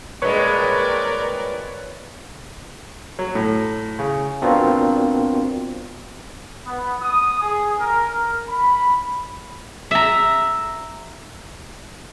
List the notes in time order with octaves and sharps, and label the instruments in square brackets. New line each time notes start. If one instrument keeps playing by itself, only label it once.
[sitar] G2 A#2 G#3 [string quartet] A#4 D5 [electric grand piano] B4 C#5 C#6
[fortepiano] F#3
A2
C#3
[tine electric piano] B3 C4 D4 F4 F#4 A#4
[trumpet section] B3
D#6
G#4
A#4
A#4
B5
[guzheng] E5 A#5